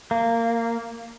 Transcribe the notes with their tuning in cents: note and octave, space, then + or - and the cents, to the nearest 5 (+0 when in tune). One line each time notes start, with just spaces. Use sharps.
A#3 -15